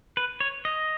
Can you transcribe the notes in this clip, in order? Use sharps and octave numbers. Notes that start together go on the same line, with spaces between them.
B4
C#5
D#5